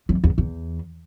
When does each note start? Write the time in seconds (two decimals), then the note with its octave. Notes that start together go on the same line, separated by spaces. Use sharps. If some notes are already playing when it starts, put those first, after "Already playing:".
0.09 F2
0.24 E2
0.38 E2